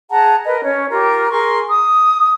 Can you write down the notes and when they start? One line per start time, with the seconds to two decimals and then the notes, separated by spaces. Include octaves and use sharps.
0.10 G#4 F#5 A5 A#5
0.45 A#4 B4 D#5
0.62 C#4 C#5
0.89 F4 G4 A#4
1.30 G#4 A#4 C6 C#6
1.69 D#6